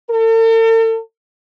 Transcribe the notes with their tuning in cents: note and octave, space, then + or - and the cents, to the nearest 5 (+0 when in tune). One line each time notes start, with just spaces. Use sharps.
A4 +45